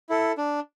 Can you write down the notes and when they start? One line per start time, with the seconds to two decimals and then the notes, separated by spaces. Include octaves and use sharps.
0.10 E4 A4
0.38 D4